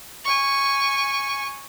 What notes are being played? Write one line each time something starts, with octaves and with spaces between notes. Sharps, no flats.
G#5 C#6